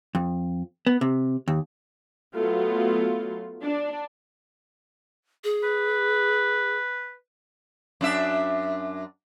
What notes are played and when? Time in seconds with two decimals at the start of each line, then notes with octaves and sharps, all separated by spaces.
0.15 F2
0.87 B3
1.01 C3
1.48 D#2
2.35 F#3 A3 B3 F4
3.64 D4
5.44 G#4
5.64 B4
8.01 F#2 D4 E5